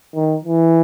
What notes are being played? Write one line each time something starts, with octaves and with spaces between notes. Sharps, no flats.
D#3
E3